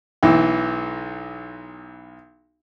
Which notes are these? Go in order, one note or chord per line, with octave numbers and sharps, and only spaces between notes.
B1 E3